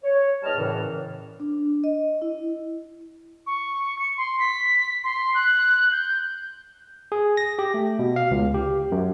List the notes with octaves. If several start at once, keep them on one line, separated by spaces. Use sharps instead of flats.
C#5
E2 G3 D#5 A5 F6
F#2 A2 C#3 E3
D4
D#5
E4
C#6
C#7
C6
B6
C6
F#6
G6
G#4
A#6
G4
A3
B2
F5
C#2
G4
F#2